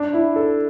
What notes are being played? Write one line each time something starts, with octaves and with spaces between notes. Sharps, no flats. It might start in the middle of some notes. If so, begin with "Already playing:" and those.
Already playing: D4
E4
A4